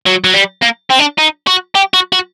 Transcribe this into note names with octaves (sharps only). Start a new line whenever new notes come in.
F#3
F#3
G3
A#3
C4
D4
D#4
F#4
G4
F#4
F#4